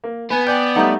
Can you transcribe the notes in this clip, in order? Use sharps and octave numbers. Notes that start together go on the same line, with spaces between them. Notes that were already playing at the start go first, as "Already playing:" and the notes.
A#3
B3 B4 G#5
D5 G5 G#5 G6
G3 A3 D#4 F#5 A#5 G6